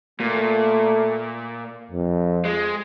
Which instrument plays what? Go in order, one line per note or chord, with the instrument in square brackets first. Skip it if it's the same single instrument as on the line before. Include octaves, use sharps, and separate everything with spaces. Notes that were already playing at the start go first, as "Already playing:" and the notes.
[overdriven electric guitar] A#2 [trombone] A3
[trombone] F2
[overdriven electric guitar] G#3